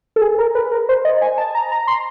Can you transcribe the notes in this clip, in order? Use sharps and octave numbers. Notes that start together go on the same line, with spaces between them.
A4
G#4
A#4
B4
A#4
C5
D#5
G#5
A5
A#5
A#5
C6